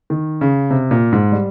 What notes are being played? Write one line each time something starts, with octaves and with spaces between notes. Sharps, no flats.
D#3
C#3
C3
A#2
G#2
G3